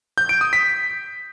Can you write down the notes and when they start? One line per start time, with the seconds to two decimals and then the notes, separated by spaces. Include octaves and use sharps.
0.18 G6
0.29 D7
0.41 D#6
0.53 B6